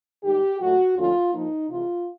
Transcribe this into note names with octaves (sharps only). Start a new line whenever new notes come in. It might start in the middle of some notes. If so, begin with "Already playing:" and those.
G#2 D#3 G3 G4
A2 F#3 A3 F#4
D#2 D3 F3 A3 C#4 F4
G#2 F3 A#3 D#4
C3 E3 G#3 F4